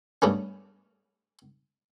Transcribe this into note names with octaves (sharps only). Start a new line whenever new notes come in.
G2 A3 B3 C#4